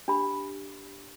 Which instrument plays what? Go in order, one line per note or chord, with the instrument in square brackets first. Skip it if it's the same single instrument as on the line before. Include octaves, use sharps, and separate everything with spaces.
[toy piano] D4 G4 B5